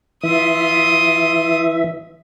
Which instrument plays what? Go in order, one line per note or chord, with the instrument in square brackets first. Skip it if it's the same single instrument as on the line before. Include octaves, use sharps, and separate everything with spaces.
[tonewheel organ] E3 E5 [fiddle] F4 D#6